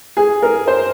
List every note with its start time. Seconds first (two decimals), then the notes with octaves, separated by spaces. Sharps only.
0.17 G#4
0.42 A#4
0.67 C5